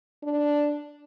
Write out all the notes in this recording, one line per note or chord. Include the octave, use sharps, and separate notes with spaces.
D4